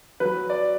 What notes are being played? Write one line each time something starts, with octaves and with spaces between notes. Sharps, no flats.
F#3 B4
D5